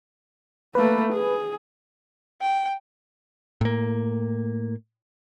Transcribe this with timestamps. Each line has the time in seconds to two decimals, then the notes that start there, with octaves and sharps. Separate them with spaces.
0.75 A3 A#3 B4
1.13 G#4
2.41 G5
3.61 A2 A#3